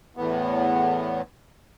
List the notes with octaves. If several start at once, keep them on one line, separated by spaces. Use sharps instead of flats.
E2 A2 B3